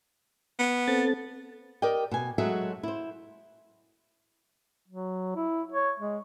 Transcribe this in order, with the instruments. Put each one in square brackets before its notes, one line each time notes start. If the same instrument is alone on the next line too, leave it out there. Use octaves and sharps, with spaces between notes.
[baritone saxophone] B3
[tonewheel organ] C4 A4 A6
[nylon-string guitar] G4 A#4 D5 D#5 G5
B2 G#5
F#3 G#3 A3 F#4 E5
E4 C5
[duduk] F#3
E4
C#5
G#3